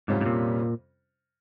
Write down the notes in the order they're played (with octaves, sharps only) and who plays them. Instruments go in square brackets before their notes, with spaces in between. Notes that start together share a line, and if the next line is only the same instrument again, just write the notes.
[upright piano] F2 C3 G3 C#4 F4 [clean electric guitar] G#2
[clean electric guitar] G#2
A#2